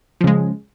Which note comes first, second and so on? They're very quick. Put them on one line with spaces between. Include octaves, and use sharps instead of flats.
F3 C#3 G#3